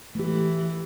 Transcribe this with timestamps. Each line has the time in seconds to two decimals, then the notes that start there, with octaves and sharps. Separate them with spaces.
0.15 E3 A3 G4